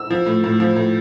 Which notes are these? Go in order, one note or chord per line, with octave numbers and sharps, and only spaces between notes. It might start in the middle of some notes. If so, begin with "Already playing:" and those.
Already playing: E6
F3
A2
A2
F3
A2